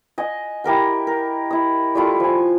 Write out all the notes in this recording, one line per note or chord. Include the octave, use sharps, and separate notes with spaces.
D#5 F#5 G#5
E4 G4 A#4 F#5
A#4
E4 D#6
G3 A3 E4 F4
F3 G#5